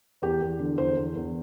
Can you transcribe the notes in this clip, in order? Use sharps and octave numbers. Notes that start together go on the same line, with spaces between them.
E2 G4
E2
D3
E2 C5
E2
E2